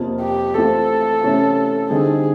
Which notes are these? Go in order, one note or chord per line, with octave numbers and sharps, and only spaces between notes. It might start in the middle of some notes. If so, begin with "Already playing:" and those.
Already playing: F2 C3 F3 A#3
G4
E3 A3 C4 F4 A4
C3 E3 A3 C#4
D3 G3 C4 D#4 G4 G#4